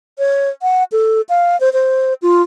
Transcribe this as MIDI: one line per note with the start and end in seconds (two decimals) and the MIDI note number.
0.18 0.49 73
0.62 0.84 78
0.92 1.21 69
1.29 1.59 77
1.60 1.69 72
1.73 2.14 72
2.22 2.42 65